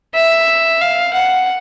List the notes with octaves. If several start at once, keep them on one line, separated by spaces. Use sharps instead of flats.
E5
F5
F#5